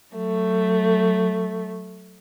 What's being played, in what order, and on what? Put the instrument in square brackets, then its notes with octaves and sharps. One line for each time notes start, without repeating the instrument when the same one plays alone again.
[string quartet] F#3 A3